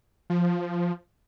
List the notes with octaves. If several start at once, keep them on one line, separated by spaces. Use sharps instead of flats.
F3